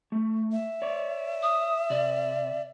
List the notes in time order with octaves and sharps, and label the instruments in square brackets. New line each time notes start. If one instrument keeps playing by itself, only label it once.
[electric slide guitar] A3
[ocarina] E5
[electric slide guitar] C#5 D5
[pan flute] D#6
[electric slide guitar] C3 [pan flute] D5